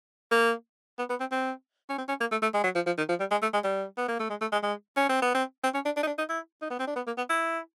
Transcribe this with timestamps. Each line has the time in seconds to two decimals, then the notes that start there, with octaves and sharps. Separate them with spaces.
0.32 A#3
0.99 B3
1.10 B3
1.20 C4
1.32 C4
1.90 C#4
1.98 C4
2.09 C#4
2.21 A#3
2.31 A3
2.42 A3
2.54 G#3
2.64 F#3
2.75 F3
2.86 F3
2.98 D#3
3.09 F3
3.20 G3
3.31 G#3
3.42 A3
3.53 G#3
3.64 G3
3.98 B3
4.08 A#3
4.20 A3
4.30 G#3
4.41 A3
4.52 G#3
4.63 G#3
4.97 C#4
5.09 C4
5.22 B3
5.35 C4
5.64 C4
5.74 C#4
5.85 D4
5.97 D4
6.03 D#4
6.07 D4
6.18 D#4
6.29 E4
6.62 D#4
6.71 B3
6.79 C4
6.87 D4
6.96 B3
7.07 A#3
7.17 B3
7.29 E4